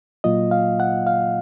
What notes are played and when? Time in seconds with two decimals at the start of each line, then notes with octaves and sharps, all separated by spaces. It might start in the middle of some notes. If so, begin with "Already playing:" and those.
0.24 A#2 F#3 A#3 F4 D#5
0.51 F5
0.80 F#5
1.07 F5